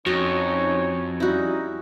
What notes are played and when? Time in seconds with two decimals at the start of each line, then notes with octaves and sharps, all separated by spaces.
0.06 F2 C#4 D#4 F#4 C#5 D#5
1.20 G3 C#4 D#4 E4 F#4